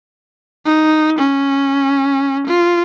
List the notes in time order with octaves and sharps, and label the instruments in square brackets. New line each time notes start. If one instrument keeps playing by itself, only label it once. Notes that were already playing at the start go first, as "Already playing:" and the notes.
[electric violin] D#4
C#4
F4